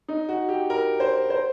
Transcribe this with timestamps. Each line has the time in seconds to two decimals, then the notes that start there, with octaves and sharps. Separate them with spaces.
0.08 D#4
0.29 F#4
0.49 G4
0.70 A#4
1.00 C5
1.30 C5